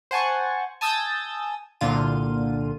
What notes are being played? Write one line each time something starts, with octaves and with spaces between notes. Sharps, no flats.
C5 F#5 G#5 A5 C#6
G#5 A5 D#6 E6 G6 A6
C2 A#2 D3 F4 D#7